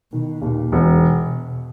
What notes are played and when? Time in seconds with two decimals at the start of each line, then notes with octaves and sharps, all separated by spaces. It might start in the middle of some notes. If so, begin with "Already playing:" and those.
0.12 B2 D#3
0.42 D#2 A#2
0.72 E1 B2